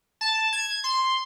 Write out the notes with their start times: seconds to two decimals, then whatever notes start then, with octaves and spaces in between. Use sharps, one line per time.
0.21 A5
0.53 G#6
0.84 C6